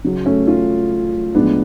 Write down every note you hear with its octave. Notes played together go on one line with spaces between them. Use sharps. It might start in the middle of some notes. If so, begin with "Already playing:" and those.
C#3 F#3
A3 C#4
C#4 F4
A2 F3 G#3 B3 D4